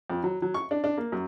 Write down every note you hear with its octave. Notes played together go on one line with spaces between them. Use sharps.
F2
F#3
F#3
C#6
D4
D4
A#3
F#2